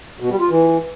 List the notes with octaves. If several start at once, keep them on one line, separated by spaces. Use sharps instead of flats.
B2
G3
F4
E3